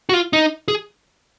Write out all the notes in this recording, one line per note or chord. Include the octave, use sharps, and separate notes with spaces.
F#4
F4
D#4
G#4